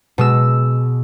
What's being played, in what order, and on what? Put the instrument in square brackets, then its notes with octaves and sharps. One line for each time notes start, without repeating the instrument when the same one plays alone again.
[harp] B2 G#3 E6